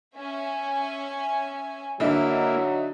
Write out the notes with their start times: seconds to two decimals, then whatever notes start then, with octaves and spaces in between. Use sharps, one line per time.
0.16 C#4 E5 G#5
2.00 D3 F#3 A#3 D#4 E4 E5